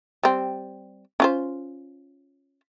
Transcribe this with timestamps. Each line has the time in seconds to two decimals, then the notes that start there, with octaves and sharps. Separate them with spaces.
0.23 G3 C4
1.20 C#4 F4 C5